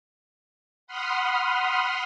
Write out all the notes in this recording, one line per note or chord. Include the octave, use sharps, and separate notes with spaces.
F#5 B5 C6 D#6 F6